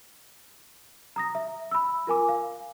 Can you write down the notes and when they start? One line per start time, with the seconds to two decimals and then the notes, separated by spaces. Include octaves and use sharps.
1.16 A#5 D#6 A#6
1.35 E5
1.71 B5 E6
2.07 F4 A#4 G#5 D6
2.29 F5